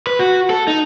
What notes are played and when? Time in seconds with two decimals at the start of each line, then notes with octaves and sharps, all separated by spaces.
0.07 B4
0.19 F#4
0.50 A4
0.68 D#4